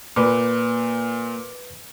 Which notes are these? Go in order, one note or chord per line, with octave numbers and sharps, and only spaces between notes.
A#2 B4 D6